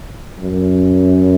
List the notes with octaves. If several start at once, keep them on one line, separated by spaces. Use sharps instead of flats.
F#2